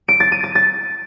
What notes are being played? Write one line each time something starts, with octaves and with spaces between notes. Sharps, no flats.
D7
A6
D#7
A6
A6